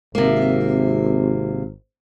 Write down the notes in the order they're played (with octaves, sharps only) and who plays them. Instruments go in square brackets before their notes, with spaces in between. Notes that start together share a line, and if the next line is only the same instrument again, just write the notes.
[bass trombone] G#1 [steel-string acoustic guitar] C3 A#3